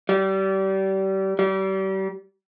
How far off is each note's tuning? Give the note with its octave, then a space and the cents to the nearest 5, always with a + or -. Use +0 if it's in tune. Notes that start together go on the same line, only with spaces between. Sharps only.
G3 -30
G3 -35